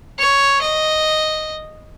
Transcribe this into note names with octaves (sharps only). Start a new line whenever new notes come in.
C#5
D#5